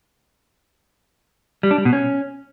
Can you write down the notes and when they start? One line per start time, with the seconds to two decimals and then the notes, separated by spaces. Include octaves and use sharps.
1.63 G3
1.71 D4
1.78 G3
1.85 B2
1.93 C#4